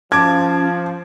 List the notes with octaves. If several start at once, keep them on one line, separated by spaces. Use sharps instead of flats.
F3 C#4 A5 D6 G#6